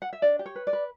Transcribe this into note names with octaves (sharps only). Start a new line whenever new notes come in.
F#5
E5
D4 D5
G4
C#5
B4
D5
B4